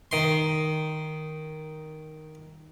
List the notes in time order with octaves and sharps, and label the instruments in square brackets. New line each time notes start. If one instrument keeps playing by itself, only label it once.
[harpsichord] D#3 C6